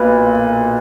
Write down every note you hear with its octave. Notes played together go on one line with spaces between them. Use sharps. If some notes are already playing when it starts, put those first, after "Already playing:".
Already playing: B1 A#2 B4